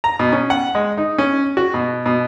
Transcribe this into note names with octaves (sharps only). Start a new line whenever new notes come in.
A#5
B2
C#4
F#5
G#3
D#4
C#4
F#4
B2
B2